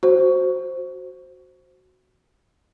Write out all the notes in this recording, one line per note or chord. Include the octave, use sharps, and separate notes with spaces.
F#4 C5